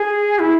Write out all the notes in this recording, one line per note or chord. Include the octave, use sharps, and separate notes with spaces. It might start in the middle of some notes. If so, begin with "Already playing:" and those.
Already playing: G#4
E4